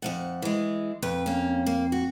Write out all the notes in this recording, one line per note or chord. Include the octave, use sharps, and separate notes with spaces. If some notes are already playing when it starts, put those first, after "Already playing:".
F2 F3 F#5
E3 G#3
F2 B4
A#3 C#4
A#3
F#4